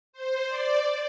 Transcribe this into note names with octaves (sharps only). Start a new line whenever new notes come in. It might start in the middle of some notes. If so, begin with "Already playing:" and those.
C5
D5